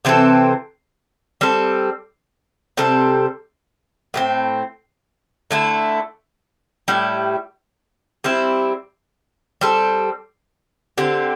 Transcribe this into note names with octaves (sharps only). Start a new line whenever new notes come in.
C3 E3 C4 A4
G3 C4 A4
C3 G3 C4 A4
A2 A3 C4
D3 A3 E4
A2 G3 E4
G3 C4 E4
G3 C4 A4
D3 C4 G4